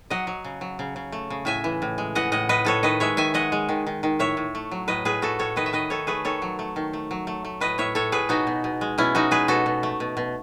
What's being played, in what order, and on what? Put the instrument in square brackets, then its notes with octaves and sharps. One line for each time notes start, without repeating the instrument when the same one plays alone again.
[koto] F#3 D#5 F#5
F#3
C#3
F#3
C#3
C#3
A3
C#3
A2 E5 G#5
E3
A2
G#3
E3 D#5 F#5
A2 D#5 F#5
A2 B4 D#5
A2 A4 C#5
D#3 B4 D#5
G#3 C#5 E5
D#3 E5 G#5
G#3 D#5 F#5
G#3
D#3
D#3
D#3
A2 C#5 E5
A2
A3
F#3
A2 B4 D#5
A2 G#4 B4
A3 F#4 A4
A2 A4 C#5
D#3 B4 D#5
E5
D#3 B4 D#5
D#3 A4 C#5
A3 G#4 B4
D#3 A4 C#5
F#3
A3
D#3
A3
F#3
A3
A3
A2 B4 D#5
A2 C#5 E5
A2 A4 C#5
A2 G#4 B4
B2 D#4 F#4
B2
B2
G#3
B2 C#4 E4
G#3 D#4 F#4
G#3 G#4 B4
B2 F#4 A4
B2
A3
B2
B2